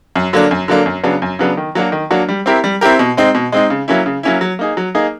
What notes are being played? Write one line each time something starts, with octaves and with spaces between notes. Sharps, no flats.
F#2
D3 F#3 A#3 D4
F#2
D3 F#3 A#3 D4
F#2
C#3 F#3 B3 D4
F#2
C#3 F#3 B3 D4
D#3
F#3 A#3 D4 F#4
D#3
F#3 A#3 D4 F#4
G3
C4 E4 G4 A#4
G3
C4 E4 G4 A#4
B2
G#3 C4 D#4
B2
G#3 C4 D#4
C#3
F#3 A#3 C#4 E4
C#3
F#3 A#3 C#4 E4
F#3
A#3 D#4 G#4
F#3
A#3 D#4 G#4